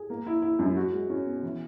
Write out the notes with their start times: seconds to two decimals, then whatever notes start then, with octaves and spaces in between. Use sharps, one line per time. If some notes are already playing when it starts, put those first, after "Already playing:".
Already playing: G#4
0.10 A#3
0.27 E4
0.42 E4
0.59 F#2
0.77 F#4
0.92 G#3
1.10 C#4
1.26 B2
1.43 E3